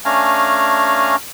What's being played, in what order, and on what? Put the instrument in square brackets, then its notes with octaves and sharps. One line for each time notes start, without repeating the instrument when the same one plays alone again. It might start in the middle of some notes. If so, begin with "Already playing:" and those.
[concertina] A3 C#4 D4 F5 G#5 A#5